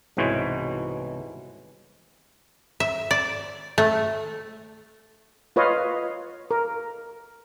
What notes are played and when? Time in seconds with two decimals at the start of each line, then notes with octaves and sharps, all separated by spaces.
0.17 C2 G#2 B2 E3 C5 C#5
2.80 E5
3.11 D5
3.78 A3
5.56 F4 B4 C#5 D#5 F5
6.51 A#4